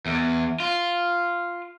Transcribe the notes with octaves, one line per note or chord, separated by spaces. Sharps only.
E2
F4